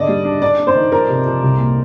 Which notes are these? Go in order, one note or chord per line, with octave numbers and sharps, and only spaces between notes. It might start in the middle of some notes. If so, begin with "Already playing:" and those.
Already playing: D3 D4 D5 D#5
G3
D4
D4 D5
D4
C5
D#3
F3 A#4
C3
F3
C2
A#2